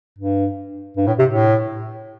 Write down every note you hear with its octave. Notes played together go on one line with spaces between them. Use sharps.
G2
G2
A2
C3
A2